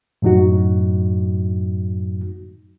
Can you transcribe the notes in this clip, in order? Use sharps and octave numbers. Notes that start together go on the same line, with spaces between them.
F#2 A2 F#3 D#4 F#4